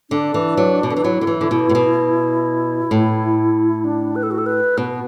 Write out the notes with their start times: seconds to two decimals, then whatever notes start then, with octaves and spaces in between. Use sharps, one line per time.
0.10 D3 D4
0.34 E3
0.57 F#3
0.83 B2
0.90 D3
0.97 E3
1.04 F#3 E4
1.21 D3
1.27 E3
1.41 D3
1.51 B2
1.69 A2
1.75 B2
2.91 A2
3.85 D4
4.16 B4
4.23 A4
4.31 F#4
4.38 A4
4.46 B4
4.78 B2 B3